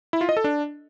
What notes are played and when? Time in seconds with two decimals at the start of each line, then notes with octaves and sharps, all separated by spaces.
0.13 E4
0.21 F4
0.29 D#5
0.37 A4
0.44 D4